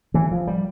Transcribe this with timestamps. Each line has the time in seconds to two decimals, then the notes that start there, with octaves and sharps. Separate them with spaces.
0.14 A2 E3
0.31 F3
0.47 G3